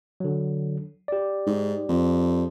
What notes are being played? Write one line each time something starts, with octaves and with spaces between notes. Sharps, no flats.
D3 F#3
G4 D5
G#2
F2